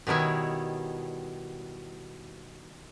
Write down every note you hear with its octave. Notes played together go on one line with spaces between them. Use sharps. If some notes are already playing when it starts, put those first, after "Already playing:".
B2 D#3 G3 E4 C#5